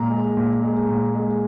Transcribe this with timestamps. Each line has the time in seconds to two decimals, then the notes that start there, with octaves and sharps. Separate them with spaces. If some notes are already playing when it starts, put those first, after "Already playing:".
Already playing: A#2 G#3 A#5
0.10 G#3
0.37 A#2
0.63 G#3
0.89 A#2
1.15 G#3